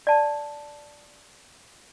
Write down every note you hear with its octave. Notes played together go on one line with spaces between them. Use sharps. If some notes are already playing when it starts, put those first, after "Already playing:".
D5 A5